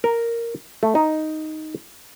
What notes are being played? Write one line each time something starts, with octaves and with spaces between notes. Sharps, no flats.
A#4
A3
D#4